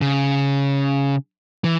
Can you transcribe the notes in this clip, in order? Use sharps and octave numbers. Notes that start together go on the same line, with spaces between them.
C#3
E3